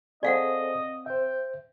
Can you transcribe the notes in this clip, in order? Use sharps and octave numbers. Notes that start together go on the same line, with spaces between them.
C4 G#4 A4 C5 D5 D#5 F5 F#5
C5 E5 G5